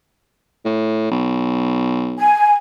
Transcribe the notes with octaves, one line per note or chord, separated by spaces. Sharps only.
A2
B1
G#5